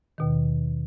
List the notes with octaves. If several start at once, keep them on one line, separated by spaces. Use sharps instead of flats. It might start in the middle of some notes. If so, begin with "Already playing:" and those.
D#2 B2 D#3